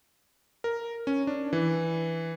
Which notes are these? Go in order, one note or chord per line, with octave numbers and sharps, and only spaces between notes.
A#4
C#4
D4
E3